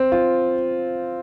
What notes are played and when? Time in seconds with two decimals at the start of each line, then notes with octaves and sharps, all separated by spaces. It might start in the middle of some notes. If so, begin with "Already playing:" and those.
Already playing: C4
0.12 F4